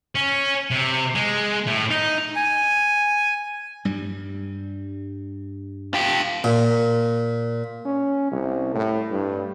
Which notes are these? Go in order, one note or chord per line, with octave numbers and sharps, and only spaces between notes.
C#4
C3
G#3
A2
D#4
G#5
G2 G3
F4 G4
A#2
C#4
C2
A2
G2